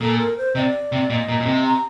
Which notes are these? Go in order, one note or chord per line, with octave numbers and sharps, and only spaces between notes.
A#2 A4
A#4
C5
C3 D#5
D5
C3
A#2 D#5
A#2
A#2
C3
A#5